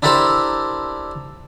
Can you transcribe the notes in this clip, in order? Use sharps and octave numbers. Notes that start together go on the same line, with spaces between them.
D4 E4 G4 A4 A#4 C5